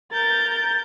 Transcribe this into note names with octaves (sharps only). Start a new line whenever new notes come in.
A#4 G6 A6